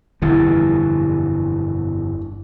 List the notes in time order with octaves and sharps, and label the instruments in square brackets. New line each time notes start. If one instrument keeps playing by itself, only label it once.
[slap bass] G1 F2 B2 [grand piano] E3